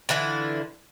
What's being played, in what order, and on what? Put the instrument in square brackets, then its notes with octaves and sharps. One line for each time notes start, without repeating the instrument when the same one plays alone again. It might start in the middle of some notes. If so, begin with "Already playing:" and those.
[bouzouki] D3 E3 E4 F4